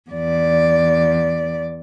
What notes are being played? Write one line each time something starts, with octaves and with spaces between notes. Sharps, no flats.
E2 D5